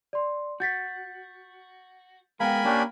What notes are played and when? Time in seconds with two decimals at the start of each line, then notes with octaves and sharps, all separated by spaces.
0.13 D5 C6
0.60 F#4 G6 A6 B6
2.40 G#3 B3 A#4 F5 G5 G#5 B5
2.65 A#3 C#4 D4 G4